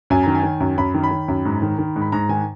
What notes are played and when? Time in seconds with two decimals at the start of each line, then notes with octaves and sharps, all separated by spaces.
0.10 F#2 G#5
0.23 D#3 A#5
0.35 G#5
0.43 D#3
0.60 F#2
0.77 F#2 B5
0.94 D#3
1.03 B5
1.11 D#3
1.28 F#2
1.45 G#2
1.62 D#3
1.79 D#3
1.96 G#2
2.01 B5
2.12 G#2 A#5
2.29 D#3 G#5